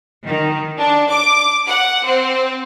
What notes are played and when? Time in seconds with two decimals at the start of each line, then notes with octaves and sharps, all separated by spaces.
0.25 D#3
0.78 D4
1.08 D6
1.67 F#5
2.04 C4